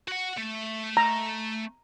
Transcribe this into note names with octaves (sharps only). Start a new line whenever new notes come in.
F#4 F#5
A3
A#5